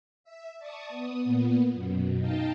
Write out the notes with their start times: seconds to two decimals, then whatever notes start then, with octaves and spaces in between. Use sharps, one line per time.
0.24 E5
0.59 D5 A5 C#6 D#6
0.89 B3 D#6
1.25 A#2 B3
1.73 F#2 B2
2.19 D#4 D#5 F5 G5 A5